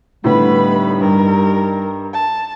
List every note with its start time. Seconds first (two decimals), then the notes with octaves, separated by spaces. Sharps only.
0.24 A2 D3 G3 B3 D#4 B4 B5
1.01 G2 A#4
2.13 A5